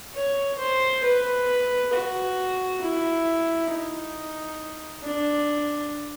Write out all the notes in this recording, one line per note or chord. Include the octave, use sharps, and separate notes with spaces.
C#5
C5
B4
F#4
E4
D#4
D4